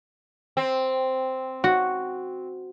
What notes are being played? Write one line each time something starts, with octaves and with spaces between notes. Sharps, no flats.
C4
F#4